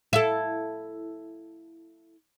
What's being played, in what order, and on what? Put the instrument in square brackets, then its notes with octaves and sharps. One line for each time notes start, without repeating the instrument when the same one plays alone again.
[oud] E4 A4